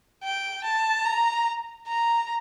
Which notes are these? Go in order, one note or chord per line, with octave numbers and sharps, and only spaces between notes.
G5
A5
A#5
A#5